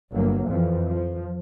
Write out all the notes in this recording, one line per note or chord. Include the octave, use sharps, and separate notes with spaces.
G1 F#3 A#3
F2 E3 F3
F3